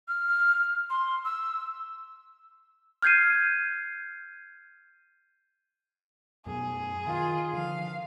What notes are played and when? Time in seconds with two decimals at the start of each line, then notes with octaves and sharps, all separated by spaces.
0.08 F6
0.90 C6
1.24 E6
3.02 F6 G6 G#6 C7 D#7
6.46 F#2 B2 G#4
7.07 D#3 F4
7.53 D3 F3 F5